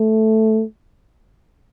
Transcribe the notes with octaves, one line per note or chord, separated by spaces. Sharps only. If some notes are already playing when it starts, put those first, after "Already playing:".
Already playing: A3